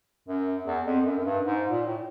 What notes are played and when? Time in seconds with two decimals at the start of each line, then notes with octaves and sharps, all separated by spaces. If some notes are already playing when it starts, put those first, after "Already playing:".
0.28 F#2
0.66 E2
0.85 F2
1.06 F#2
1.19 F#2
1.25 G2
1.43 G#2
1.69 A#2
1.87 A2